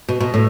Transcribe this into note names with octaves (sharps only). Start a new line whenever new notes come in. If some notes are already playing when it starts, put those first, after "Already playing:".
B2
B2
A2